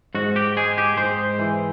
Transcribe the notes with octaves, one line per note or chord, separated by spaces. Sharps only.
G#2 F#4
G4
G#3 G#4
G4
G#2 C5
E3